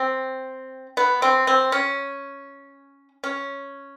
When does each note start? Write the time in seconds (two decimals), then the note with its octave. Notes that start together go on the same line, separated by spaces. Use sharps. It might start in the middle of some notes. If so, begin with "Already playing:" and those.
Already playing: C4
0.97 B3
1.22 C4
1.47 C4
1.72 C#4
3.24 C#4